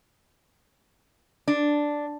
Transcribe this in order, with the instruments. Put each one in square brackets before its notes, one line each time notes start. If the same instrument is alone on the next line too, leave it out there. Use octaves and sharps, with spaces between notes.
[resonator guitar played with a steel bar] D4